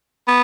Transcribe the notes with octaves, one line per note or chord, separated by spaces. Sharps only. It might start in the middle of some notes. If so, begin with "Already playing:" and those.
B3